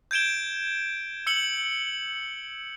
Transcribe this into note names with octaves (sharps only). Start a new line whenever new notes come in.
G6 G#6 D7 E7 G7
E6 C#7 F#7 G7